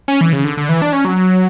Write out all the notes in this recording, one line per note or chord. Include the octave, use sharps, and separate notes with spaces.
C#4
E3
C#3
D3
D3
E3
D4
C#4
F#3